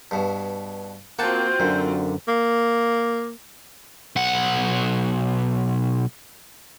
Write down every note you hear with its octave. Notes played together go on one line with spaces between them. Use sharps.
G2 B2
A#3 C4 F4 F#4 F#5 G5 A5 G6
F#2 A#2 D3
A#3
B1 F#5